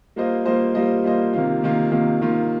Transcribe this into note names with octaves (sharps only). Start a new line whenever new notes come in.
G3 A#3 F4 C5 D#5
G3 A#3 F4 C5 D#5
G3 A#3 F4 C5 D#5
G3 A#3 F4 C5 D#5
C3 D#3 A#3 F4
C3 D#3 A#3 F4
C3 D#3 A#3 F4
C3 D#3 A#3 F4